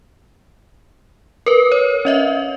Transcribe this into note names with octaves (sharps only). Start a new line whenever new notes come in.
A#4 B4
C#5
C#4 D#5 E5